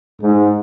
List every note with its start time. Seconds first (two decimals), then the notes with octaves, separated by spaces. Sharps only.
0.21 G#2